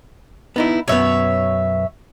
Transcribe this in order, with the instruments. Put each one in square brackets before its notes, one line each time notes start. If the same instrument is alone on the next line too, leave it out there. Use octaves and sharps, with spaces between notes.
[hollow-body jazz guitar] B3 D#4 E4
[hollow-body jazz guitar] B1 F#2 B3 [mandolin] C#5 E5